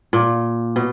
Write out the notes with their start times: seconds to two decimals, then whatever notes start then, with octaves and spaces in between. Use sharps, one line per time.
0.13 A#2
0.76 B2